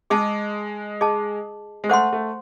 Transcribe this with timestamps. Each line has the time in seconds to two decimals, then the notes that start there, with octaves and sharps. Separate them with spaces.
0.10 G#3 G#4 D#5 A5
1.01 G#4 D#5 A5
1.84 G#3
1.89 A3 C5 F#5 C6
2.13 A3